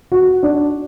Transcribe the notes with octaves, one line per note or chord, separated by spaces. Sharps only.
F#4
D4